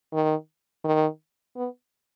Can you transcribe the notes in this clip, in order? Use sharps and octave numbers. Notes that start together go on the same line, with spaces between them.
D#3
D#3
B3